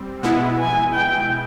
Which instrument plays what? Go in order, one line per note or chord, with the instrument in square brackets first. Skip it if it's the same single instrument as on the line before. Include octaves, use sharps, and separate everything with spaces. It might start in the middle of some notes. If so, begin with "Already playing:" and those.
Already playing: [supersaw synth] G3 C4
[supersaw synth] B2 G#3 B3 E4 [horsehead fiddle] F#5
[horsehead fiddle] G#5
G5